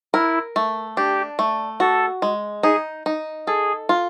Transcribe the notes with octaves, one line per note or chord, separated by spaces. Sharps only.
E4 A#4
A3
D4 G4
A3
F#4 A4
G#3
D#4 G#4
D#4
G#4 A4
F4